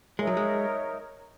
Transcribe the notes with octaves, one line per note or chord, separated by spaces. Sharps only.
G#3 D#4 A#4 C#5 E5
F#3
G#3